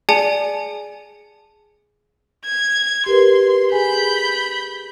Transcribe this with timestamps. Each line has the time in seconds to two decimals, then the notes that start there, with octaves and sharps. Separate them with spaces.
0.09 G#4 D5 G#5 A5 C#7 F7
2.45 G#6
3.06 G4 A#4 B4 C6
3.72 G#4 G#5 B5 G6